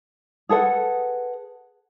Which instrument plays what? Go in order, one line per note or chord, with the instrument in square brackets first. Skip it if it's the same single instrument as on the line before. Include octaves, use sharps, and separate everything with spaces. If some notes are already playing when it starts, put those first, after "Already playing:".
[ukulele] G#4 A4 B4 F#5